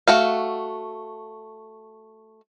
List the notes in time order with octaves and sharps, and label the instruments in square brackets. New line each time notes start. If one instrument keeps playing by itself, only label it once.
[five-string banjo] A3 F#4 F5